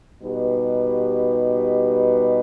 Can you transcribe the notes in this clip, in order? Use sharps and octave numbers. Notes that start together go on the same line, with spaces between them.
B2 G3 D#4 G4 B4